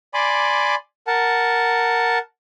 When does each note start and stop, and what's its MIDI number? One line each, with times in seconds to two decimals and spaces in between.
0.14 0.75 74
0.14 0.75 80
0.14 0.75 83
0.14 0.75 84
0.14 0.75 86
1.07 2.18 70
1.07 2.18 78
1.07 2.18 81